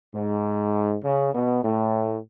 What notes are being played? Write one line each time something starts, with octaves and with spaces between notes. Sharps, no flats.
G#2
C#3
B2
A2